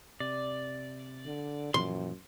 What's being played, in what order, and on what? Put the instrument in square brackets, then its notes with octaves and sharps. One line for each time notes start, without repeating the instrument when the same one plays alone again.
[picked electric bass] C3 [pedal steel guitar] D5
[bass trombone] D3
[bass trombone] F#2 [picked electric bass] A#2 E3 F3 [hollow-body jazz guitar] C6